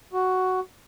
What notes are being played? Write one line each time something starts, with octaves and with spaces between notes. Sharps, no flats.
F#4